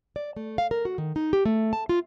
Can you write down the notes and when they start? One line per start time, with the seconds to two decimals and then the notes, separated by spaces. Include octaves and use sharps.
0.16 D5
0.37 A3
0.58 F5
0.71 A#4
0.85 F#4
0.98 D#3
1.16 D#4
1.33 G4
1.45 A3
1.73 A5
1.89 F4